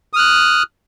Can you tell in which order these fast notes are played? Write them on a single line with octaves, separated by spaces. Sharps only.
D#6 F6 F#6